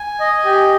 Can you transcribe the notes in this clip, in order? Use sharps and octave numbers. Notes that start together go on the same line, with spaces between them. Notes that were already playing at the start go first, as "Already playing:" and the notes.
Already playing: G#5
D#5
G4